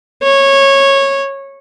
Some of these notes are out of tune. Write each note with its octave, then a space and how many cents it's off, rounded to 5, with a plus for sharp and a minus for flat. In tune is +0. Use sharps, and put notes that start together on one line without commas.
C#5 -15